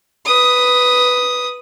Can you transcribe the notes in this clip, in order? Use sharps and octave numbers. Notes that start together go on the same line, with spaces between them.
B4 D#6